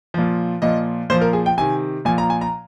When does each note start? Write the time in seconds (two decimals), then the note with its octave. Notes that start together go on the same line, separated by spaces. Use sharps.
0.14 A#2 F3
0.62 A#2 F3 D#5
1.10 A#2 F3 C5
1.21 A#4
1.33 G#4
1.46 G5
1.58 C3 D#3 G#5
2.05 A#2 F3 G#5
2.18 A#5
2.30 G#5
2.41 A#5